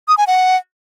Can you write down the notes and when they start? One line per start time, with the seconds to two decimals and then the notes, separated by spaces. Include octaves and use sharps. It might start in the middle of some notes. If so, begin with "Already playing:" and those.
0.08 D#6
0.17 G#5
0.27 F#5